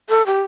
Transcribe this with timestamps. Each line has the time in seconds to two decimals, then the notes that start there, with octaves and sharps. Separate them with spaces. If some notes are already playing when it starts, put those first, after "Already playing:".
0.09 A4
0.26 G4